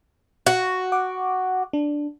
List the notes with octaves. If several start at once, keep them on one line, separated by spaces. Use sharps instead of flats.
F#4
F#5 D6
D4